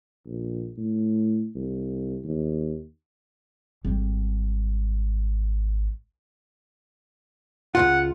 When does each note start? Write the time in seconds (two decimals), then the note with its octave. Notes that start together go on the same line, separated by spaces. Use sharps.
0.26 A#1
0.77 A2
1.56 C2
2.24 D#2
3.85 G#1 G3
7.75 C#2 G2 F4 F#5